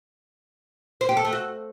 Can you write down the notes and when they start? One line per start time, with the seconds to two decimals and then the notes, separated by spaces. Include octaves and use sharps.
1.01 C5
1.09 G4
1.17 A4
1.25 A3
1.33 F#4